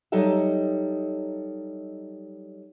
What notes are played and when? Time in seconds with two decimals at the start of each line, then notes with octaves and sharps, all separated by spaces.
0.12 F#3 G3 D#4 A4 D#5 E5